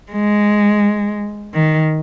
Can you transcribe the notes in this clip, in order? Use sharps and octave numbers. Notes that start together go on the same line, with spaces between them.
G#3
D#3